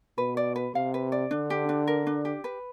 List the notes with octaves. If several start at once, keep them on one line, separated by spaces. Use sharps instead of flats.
B2 B4
D5
B4
C3 F5
B4
D5
D3 D4
G4
D4
A#4
D4
G4
B4